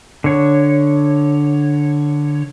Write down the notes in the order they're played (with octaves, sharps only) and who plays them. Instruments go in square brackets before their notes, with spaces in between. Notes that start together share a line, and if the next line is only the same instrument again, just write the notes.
[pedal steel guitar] D3 C#5